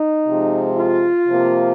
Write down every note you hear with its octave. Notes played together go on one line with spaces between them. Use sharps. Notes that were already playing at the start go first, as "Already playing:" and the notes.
Already playing: D#4
C3 F3 G#3
F4
C3 F3 A#3